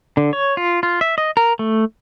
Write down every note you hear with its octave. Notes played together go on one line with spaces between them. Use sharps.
D3
C#5
F4
F4
E5
D#5
A#4
A3